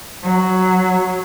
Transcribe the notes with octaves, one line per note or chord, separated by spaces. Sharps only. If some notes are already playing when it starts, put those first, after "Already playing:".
F#3